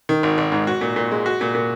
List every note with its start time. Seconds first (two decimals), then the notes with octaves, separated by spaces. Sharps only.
0.09 D#3
0.23 G#1
0.38 G#1
0.52 G#2
0.67 F#4
0.81 A#2
0.96 A#2
1.12 G#3
1.26 F#4
1.41 A#2
1.55 A#2